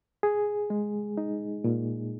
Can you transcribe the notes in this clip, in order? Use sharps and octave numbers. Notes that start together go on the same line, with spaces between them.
G#4
G#3
D#4
A#2